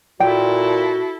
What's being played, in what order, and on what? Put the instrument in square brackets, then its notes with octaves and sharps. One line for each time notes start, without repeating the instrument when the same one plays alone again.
[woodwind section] A#2 [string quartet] E4 A4 [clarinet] F#4 [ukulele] G5